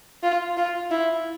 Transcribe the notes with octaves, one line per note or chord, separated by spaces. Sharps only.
F4
F4
E4